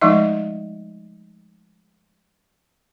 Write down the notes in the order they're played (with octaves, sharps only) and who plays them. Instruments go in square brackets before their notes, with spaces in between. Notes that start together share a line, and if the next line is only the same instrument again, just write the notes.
[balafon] F3 G#3 A3 D#4 D#5